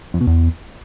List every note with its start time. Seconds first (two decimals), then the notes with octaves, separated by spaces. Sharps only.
0.14 F2
0.20 B2
0.27 E2